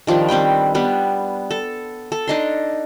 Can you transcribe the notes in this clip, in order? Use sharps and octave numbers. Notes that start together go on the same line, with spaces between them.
D#3 F3 G3 D4
G3 C4 B4 G5
G3 B3 D4
A4
A4
D4 D#4 C6